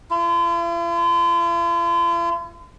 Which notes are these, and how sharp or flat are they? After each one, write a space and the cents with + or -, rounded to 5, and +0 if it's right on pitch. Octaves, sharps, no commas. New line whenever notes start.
F4 -45